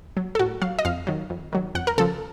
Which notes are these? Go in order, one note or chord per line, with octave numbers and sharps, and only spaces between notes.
F#3
A4
A2 F#4
F#3 F5
D#5
F2 F5
D#3 F#3
F2
D#3 F#3
F2 F#5
A#4
C#3 F3 A4